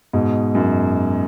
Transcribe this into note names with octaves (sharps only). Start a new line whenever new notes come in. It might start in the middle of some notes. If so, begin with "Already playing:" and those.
G#2 B2
F#2